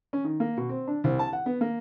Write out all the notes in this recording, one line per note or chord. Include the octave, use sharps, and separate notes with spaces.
C#4
D#3
A#3
B2
C4
D4
C2
A5
F#5
B3
A#3